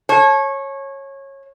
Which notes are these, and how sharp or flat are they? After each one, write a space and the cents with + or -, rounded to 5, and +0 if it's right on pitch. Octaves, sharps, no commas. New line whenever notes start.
C#5 -20 A5 -35